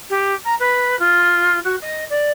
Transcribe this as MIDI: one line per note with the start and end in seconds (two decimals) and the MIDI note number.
0.10 0.34 67
0.45 0.55 82
0.60 0.99 71
0.99 1.60 65
1.64 1.76 66
1.82 2.05 75
2.10 2.31 74